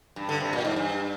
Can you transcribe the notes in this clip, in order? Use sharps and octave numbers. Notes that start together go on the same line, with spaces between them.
G2
D3
C3
A#2
G#2
G2